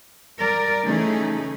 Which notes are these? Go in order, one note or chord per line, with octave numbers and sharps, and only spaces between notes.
G3 A#4 D5
C#3 E3 A3 C#4 D#4 G#4